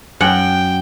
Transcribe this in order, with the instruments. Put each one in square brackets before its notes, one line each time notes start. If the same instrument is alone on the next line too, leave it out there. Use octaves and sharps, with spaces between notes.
[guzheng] F#2 F#5 [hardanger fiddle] G5